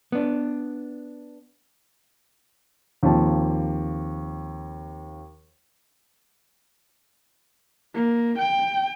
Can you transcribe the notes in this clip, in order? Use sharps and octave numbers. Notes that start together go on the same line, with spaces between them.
B3 D4
D#2 F3 C4 A5
A#3
G5